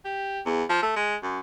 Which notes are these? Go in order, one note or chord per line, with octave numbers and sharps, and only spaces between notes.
G4
E2
F3
A3
G#3
F#2